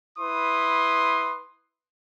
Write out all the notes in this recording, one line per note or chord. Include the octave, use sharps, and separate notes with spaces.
E4 B4 C6 D#6